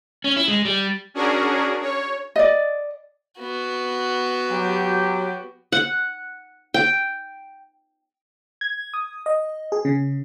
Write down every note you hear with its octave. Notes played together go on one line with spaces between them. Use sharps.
C#4
E4
G#3
G3
C#4 D4 F#4 G#4 A#4
C#5
D5 D#5
B3 F#4
F#3 G4
F#5
G5
G#6
D#6
D#5
G#4
C#3